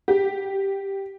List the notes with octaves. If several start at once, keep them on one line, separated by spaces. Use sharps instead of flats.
G4